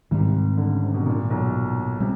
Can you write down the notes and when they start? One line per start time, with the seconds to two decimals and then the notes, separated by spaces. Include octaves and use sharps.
0.11 C2 G#2 C3 D#3 G3
0.57 D3
0.70 C#3
0.83 C3
0.94 B2
1.06 A#2
1.30 B1 B2
2.00 C3 G3